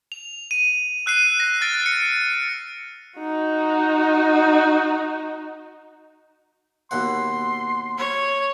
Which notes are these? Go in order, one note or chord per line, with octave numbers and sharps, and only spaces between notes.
F7
D#7
E6 F#6 C7 D#7
A#6
F6 A6 D7
C#7
D#4 F#4
D#2 B2 F#5 C6
C#5